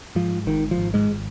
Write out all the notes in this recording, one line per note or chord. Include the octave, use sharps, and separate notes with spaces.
G#2 F3
G#1 D#3
F3
G#1
G#2 G#3